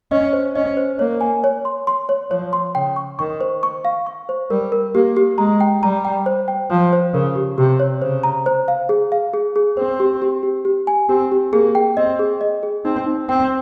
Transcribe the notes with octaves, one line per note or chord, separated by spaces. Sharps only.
C#4 D#5
C5
C#4 D#5
C5
A#3 C#5
G#5
C#5
C6
C6
C#5
F3 C#5
C6
C#3 G5
C#6
D#3 C#6
C5
C#6
F5
C#6
C5
G3 A#4
A#4
A#3 G4
G4
G#3 A#5
G5
G3 A#5
G5
C5
G5
F3 C5
C5
C#3 A#4
G4
C3 G4
C#5
C#3 C5
A#5
C5
F5
G#4
F5
G#4
G#4
C4 C5
G4
G4
G4
G4
G#5
C4 G4
G4
A#3 G#4
G5
C4 D#5
G#4
D#5
G#4
C4 D#4
D#4
C4 G5